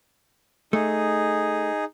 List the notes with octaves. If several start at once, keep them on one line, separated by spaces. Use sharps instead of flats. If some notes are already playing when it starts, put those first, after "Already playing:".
A3 D#4 G#4